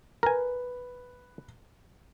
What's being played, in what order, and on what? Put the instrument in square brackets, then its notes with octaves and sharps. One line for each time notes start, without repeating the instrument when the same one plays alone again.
[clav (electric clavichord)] A#4 G#5 [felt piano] B4